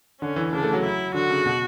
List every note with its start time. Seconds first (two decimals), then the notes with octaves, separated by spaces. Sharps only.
0.21 D3 C#4
0.36 E3
0.53 C#3 D4
0.63 A3
0.73 F#3
0.84 E4
1.14 D3 F#4
1.30 C#3
1.46 B2